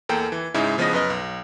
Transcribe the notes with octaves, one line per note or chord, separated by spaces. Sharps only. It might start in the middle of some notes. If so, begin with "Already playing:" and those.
E2 A#3 A4 G5
E3
G#2 C#3 G#3 D#4 E4
C#3 F3 B3 B4 D#5 A#6
F#2 B4 D#5 F6
B1